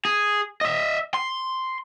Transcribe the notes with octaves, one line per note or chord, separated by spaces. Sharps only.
G#4
D#5 E5
C6